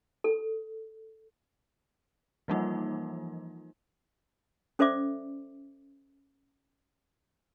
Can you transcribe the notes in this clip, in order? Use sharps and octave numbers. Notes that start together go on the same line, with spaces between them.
A4
E3 F3 G3 A#3 D#4 F4
C#4 A4 C5 D5 E5 D6